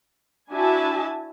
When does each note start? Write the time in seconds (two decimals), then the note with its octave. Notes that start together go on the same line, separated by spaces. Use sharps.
0.50 D4 E4 F#4 E5 G#5 A5